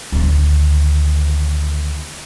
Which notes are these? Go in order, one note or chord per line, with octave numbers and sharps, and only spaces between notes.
D2 D#3